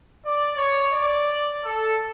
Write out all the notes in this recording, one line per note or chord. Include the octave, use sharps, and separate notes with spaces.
D5
C#5
D5
A4